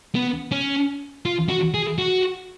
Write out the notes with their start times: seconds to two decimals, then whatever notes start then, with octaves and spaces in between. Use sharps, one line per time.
0.15 B3
0.52 C#4
1.25 F4
1.49 F#4
1.74 G#4
1.98 F#4